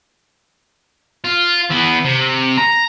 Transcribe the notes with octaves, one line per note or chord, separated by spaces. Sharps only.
F4
E3 B3
C3
A#5